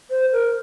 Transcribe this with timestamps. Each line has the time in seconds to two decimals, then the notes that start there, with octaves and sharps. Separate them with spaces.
0.10 C5
0.32 A#4